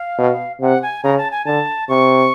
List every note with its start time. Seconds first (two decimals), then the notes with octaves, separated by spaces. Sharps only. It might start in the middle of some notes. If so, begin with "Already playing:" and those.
Already playing: F5
0.18 B2
0.61 C3 F#5
0.82 G#5
1.04 C#3 A#5
1.17 A5
1.31 G#5
1.45 D3 A5
1.89 C3 C#6